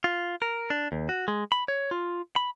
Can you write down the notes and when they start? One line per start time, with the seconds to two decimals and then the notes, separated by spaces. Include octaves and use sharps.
0.04 F4
0.42 A#4
0.70 D4
0.92 D#2
1.09 F#4
1.28 G#3
1.52 B5
1.68 C#5
1.91 F4
2.36 B5